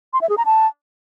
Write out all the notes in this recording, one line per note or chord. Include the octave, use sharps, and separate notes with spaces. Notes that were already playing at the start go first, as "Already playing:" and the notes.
C6
E5
G#4
A#5
A5